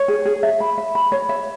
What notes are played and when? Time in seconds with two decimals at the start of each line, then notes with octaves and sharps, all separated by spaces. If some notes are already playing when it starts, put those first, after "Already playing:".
Already playing: C#5
0.08 G#4
0.25 G#4
0.43 E5
0.60 B5
0.78 E5
0.95 B5
1.12 C#5
1.29 E5